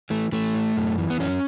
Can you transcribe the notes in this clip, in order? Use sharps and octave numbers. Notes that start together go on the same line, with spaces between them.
E3 A3
E3 A3
A2
F#2
E3
B3
F#2 C#4